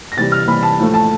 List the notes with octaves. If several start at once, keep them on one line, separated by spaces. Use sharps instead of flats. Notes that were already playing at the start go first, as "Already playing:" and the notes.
A#6
C3 E3 G3 A6
F6
C3 E3 G3 B5
A5
A2 F3 A3
A5